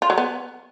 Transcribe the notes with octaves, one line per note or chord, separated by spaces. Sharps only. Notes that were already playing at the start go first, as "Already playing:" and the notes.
F4
F#3
B3